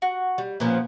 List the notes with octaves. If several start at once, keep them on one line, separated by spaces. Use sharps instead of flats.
F#4
G3
A#2 F3 B3 C#4